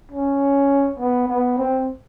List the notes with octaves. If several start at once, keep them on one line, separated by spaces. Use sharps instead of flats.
C#4
B3
B3
C4